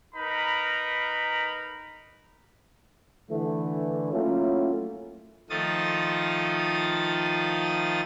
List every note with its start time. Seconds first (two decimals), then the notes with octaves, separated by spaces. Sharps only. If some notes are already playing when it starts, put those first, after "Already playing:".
0.15 D#4 A#4 B4 A#5 B5
3.30 D3 E3 A3
4.12 F#3 A3 A#3 C#4 E4 F4
5.50 D#3 F3 A3 F4 D#6 A6